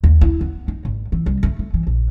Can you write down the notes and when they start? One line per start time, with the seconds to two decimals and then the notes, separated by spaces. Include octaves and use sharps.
0.04 D#2
0.21 E4
0.41 B3
0.68 D#4
0.85 G#1
1.12 E3
1.26 C2
1.43 A3
1.59 A3
1.74 E3
1.87 A#1